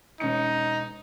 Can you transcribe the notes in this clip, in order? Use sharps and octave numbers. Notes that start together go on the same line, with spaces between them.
E1 C#4 D#4 C#7